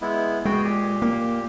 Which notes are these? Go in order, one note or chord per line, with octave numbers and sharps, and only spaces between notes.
G#3 B3 E4
G#3 B3 F#4 G5
A#2 G4
A#3